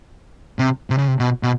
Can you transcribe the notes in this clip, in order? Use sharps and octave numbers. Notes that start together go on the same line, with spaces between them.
C3
C3
C#3
C3
B2
B2